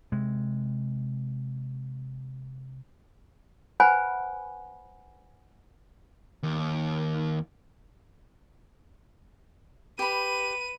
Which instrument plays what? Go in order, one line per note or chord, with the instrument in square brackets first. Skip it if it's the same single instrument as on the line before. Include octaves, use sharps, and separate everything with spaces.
[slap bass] C3 G#3
[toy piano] B4 C5 F#5 G#5 B5
[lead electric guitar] D#2
[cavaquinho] G4 B5 [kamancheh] B4 [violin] D#7